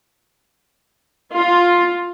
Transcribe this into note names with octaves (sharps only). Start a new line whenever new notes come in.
F4